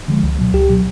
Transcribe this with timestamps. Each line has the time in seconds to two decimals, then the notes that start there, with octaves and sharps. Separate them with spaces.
0.08 D3 F3 G#3
0.23 C#2
0.39 B2 F#3
0.54 C#2 G4
0.69 B2 F#3